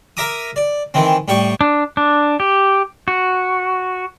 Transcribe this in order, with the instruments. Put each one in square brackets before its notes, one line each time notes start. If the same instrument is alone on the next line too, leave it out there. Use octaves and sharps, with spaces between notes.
[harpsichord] A#4 E5 A#5 D6 D#6
D5
D#3 E3 C4
A2 G3 G5 C#6
[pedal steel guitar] D4
D4
G4
F#4